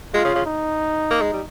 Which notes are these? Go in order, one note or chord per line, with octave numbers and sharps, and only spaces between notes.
G#3 F4
C#3
C#3
D#4
A#3
G#3
G3